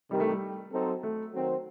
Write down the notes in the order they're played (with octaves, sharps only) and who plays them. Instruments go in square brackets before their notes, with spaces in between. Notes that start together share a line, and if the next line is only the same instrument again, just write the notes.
[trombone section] C2 C3 D#3 [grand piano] G3
[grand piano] A3
G3
[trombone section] F#3 C4 D#4 A4 C5
[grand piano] A3
[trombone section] D#3 F#3 C4